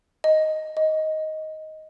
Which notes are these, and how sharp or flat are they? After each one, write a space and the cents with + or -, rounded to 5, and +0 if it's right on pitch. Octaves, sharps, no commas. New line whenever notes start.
D#5 +5
D#5 +10